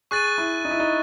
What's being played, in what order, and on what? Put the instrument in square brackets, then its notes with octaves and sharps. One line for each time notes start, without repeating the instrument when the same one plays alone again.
[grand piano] G#4 [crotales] C#6 F#6 A6 D#7
[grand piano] E4
D#4
E4
D#4